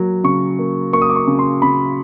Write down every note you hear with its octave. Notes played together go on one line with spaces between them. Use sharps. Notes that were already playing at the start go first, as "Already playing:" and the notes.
Already playing: F#3 A#3
C#3 C#6
A#3
A#3 C#6
D#6
D6
C#6
C#3
C6
C#3 B5